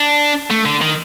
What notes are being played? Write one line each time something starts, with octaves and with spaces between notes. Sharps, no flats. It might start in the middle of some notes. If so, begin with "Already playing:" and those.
Already playing: D4
A3
D3
D#3